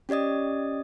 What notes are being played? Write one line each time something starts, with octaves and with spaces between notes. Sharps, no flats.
C#4 G4 D5 D#5 D#6